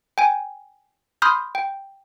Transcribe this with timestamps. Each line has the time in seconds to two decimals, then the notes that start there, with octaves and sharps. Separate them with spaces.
0.18 G5 G#5
1.22 B5 C6 D#6 F6 G6
1.55 G5